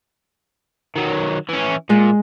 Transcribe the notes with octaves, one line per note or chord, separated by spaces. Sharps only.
D#3 F#3
E3 C#4
A#2 G#3